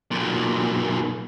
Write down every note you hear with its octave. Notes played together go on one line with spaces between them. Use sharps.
B1 A#2